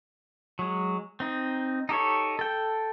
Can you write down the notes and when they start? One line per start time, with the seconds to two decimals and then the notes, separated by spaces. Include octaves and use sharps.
0.59 F#3 G#3
1.20 C4 D#4
1.89 D#4 G4 A4 C#5
2.39 A4 G5